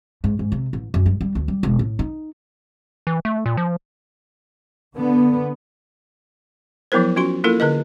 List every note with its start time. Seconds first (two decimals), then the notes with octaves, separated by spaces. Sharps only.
0.24 G#2
0.39 G#2
0.52 C3
0.73 A1
0.94 F#2
1.06 G2
1.21 G3
1.35 D2
1.48 G3
1.63 E1
1.79 A2
1.99 D#4
3.07 E3
3.25 A3
3.46 A#2
3.57 F3
4.96 D3 B3
6.92 F3 F#3 B3 E4 A#4 C5
7.16 C#4 F4 F#4 C6
7.44 A#3 E4 F4 A4 A#4
7.60 D3 A#4 B4 D#5